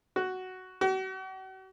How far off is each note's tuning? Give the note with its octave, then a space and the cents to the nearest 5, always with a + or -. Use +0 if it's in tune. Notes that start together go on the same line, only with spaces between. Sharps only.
F#4 +5
F#4 +40